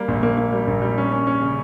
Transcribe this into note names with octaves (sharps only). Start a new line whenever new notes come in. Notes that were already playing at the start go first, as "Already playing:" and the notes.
Already playing: G3 A#3
A#1
A#3
A#3
G3
A#1
G3
C#4
C#4
C#4
C#3